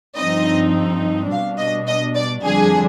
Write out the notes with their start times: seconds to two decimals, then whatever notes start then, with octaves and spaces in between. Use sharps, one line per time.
0.17 G2 F3 C4 D#4 D#5
1.31 B2 G3 D4 F5
1.59 D#5
1.87 D#5
2.16 D5
2.43 F2 D3 G3 D4 G#4